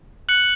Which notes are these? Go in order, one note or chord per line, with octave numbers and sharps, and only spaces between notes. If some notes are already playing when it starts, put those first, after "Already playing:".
F#6 C#7 F#7